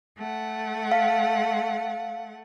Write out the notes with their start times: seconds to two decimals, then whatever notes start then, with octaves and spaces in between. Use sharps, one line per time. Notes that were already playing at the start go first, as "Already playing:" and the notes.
0.18 A3 F#5
0.92 F5